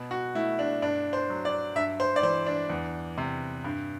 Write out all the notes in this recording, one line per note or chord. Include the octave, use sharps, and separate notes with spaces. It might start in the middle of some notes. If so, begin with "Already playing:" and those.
Already playing: B2
F#4
A3 E4
D4
G2 D4
C5
F#3
D5
G2 E5
C5
D5
E3 C5
D4
E2
C3
G2